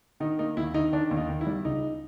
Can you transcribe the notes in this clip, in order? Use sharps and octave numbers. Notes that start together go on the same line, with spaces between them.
D#3 D#4
A#3 D#4
D#2 E4
D#3 D#4
D#3 D4
D#2
D#4
D#3
E4
G3
C#2 D#4